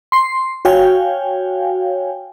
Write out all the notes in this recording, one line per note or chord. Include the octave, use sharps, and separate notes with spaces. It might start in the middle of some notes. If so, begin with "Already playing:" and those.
C6 C7
F#4 C#5 F5 G5 G#5